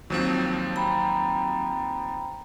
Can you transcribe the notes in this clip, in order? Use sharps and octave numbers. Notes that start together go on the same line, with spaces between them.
D#2 F3 F#3 C4
G5 A#5 B5